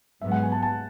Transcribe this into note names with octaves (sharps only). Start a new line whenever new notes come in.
G#2 F#3 B3 E5
F#5
G#5
A5
A5